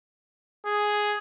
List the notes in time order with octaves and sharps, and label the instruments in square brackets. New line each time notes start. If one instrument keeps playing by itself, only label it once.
[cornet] G#4